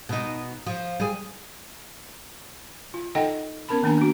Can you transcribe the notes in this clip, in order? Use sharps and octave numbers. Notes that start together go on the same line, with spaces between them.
B2 D#4
F3
G3 G#4
F4
D#4 A4 D#5 F#5 G5
B3 C#4 A#4 A5 B5
D#3 A#3 D4 G#5 A#5
A#3 D4 F#4